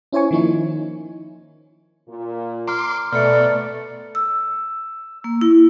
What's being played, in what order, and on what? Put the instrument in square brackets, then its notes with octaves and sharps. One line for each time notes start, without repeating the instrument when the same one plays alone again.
[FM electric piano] C#4 E4 C5 C#5 G#5 C#6
D#3 F3 A#3 D#4 E4
[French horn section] A#2
[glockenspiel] A#5 F6 [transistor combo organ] C6 D6
[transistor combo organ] B2 [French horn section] A3 [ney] D5 [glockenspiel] F6 C#7
[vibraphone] E6
A#3
E4